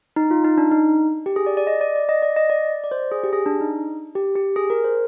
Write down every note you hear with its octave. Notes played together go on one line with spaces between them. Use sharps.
D#4
F4
D#4
D4
D#4
G4
G#4
D5
D5
D#5
D5
D5
D#5
D5
D#5
D5
D5
C5
G#4
G4
G#4
D4
D#4
G4
G4
G#4
A#4
C5